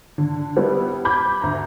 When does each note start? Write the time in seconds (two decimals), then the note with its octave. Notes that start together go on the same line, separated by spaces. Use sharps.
0.18 D3
0.56 G3 B3 E4
1.05 B5 D6 G6 G#6
1.42 D2 A#5